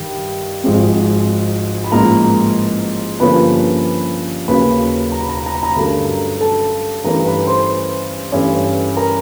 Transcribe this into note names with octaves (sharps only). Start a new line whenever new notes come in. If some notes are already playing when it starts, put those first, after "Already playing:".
Already playing: G2 D#3 G3
G#1 G#2 F3 G#3 C4
B5
A1 G#2 F3 A#3 A#4 A#5
G2 D3 F3 A#3 C#4 B4 B5
D#2 C#3 F#3 A#3 B4 B5
A#5
B5
A#5
B5
A#5
B5
A#5
B5
G2 D3 F#3 A3 C#4 A#4 A#5
A4 A5
G2 E3 A3 C#4 A#4 A#5
B4 B5
C5 C6
G2 E3 A3 C#4
A#4 A#5